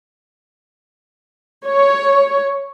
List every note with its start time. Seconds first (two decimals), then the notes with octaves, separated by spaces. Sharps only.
1.66 C#5